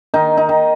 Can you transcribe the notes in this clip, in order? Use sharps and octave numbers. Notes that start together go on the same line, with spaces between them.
D#3 D#4
D#4
D#3